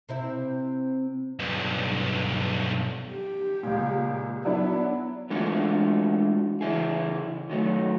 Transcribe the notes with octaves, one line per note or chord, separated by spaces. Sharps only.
C3 C4 E4
B1 G2
G4
C#2 A#2
F#3 B3 D4 E4
E3 G#3 A3 D4 F4 F#4
C#3 E3 E4 G#4
D#3 F#3 A3